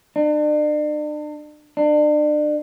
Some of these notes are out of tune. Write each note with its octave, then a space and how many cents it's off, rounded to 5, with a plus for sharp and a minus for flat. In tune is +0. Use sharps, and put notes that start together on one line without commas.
D4 +40
D4 +35